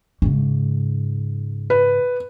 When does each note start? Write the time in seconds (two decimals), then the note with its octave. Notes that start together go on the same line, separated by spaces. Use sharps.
0.22 G#2 C#3
1.70 B4